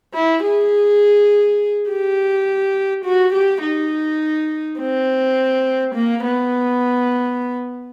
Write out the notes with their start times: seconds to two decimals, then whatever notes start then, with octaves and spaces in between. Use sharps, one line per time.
0.14 E4
0.43 G#4
1.89 G4
3.05 F#4
3.33 G4
3.62 D#4
4.80 C4
5.96 A#3
6.24 B3